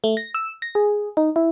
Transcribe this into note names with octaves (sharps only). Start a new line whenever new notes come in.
A3
A#6
E6
A#6
G#4
D#4
E4